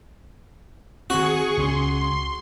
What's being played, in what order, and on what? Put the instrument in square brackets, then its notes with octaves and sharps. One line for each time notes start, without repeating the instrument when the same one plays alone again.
[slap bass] D#3 C4 [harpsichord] F#4 [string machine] G#4 C#6
[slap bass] C#2 C4 C#4 [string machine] C6